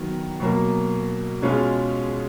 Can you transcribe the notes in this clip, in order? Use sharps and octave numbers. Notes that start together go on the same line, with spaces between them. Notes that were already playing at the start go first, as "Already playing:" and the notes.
Already playing: D#3 F#3 B3
B2 F#3 A#3
B2 G#3 C#4 F4 G#4